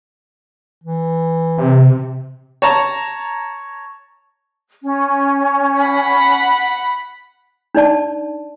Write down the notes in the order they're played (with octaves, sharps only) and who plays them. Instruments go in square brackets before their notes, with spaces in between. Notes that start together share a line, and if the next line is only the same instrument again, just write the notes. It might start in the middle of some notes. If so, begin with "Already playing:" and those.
[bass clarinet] E3
[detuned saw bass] C3
[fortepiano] C#5 A5 A#5
[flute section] C#4
[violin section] F#5 B5 B6
[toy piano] D4 D#4 D5 A5